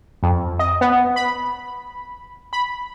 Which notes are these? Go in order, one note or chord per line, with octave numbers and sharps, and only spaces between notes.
F2
D#5
B3
B5
B5